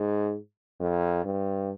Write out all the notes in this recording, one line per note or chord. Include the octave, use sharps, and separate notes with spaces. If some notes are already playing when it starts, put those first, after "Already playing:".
Already playing: G#2
F2
G2